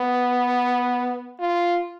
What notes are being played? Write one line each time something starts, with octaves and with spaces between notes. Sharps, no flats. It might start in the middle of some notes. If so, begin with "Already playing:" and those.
Already playing: B3
F4